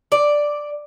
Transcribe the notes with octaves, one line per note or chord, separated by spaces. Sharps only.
D5